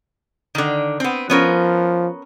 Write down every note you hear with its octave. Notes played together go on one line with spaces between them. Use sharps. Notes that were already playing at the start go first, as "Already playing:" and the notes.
D3 D#3
B3 C4
F3 B3 C#4 A#4